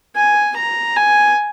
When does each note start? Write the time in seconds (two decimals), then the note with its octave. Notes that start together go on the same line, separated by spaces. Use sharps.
0.16 G#5
0.56 A#5
0.96 G#5